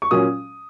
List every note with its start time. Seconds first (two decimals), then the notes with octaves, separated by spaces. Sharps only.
0.02 C#6
0.11 A#2 F#3 C#4 D#6